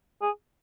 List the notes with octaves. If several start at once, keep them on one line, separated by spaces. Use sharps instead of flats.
G#4